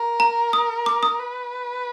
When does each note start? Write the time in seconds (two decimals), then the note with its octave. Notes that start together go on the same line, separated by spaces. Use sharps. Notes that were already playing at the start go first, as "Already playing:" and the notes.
Already playing: A#4
0.20 A#5
0.53 D#6
0.86 D6
1.03 D#6
1.20 B4